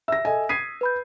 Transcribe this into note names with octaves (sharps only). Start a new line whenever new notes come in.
E5 E6 A#6
A4 D#5 G#5
D#6 G#6 B6 C7 D#7
B4 B5 G6